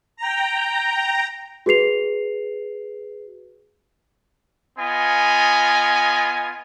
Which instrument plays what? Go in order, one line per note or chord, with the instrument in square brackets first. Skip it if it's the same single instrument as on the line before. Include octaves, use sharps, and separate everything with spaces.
[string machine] G5 A#5
[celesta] F#4 G#4 B4 C7 F7
[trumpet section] B3 F4 D#5 G#5